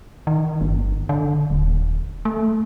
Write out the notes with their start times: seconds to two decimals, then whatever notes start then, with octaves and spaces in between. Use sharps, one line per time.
0.27 D#3
0.61 G1
1.09 D3
1.50 D#1
2.25 A3